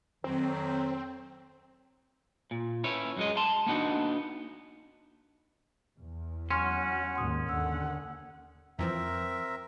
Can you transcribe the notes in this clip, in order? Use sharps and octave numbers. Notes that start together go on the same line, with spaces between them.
F2 D#3 F#3 C4
A#2
C#4 E4 B4 C#5
F#2 G#3 D#5
A5 C6
A#3 B3 D4 D#4 F#4
E2
F#3 C#4 F#5 C6 C#6 F6
D#2 G#2 C6 D#6
D#2 D3 F#5 E6
F2 E3 F3 C4 A#4 E5